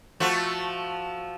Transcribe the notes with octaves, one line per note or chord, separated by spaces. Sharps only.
F3 A3 F#4